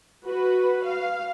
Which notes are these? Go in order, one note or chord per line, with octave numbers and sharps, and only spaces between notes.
F#4 B4
F5